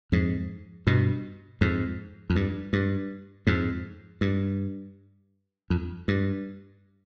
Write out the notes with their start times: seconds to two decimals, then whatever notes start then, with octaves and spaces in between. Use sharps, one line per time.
0.12 F2 G#2
0.87 G2 B2
1.61 F2 G#2
2.30 F2
2.36 G2
2.73 G2
3.47 F2 G#2
4.21 G2
5.70 F2
6.08 G2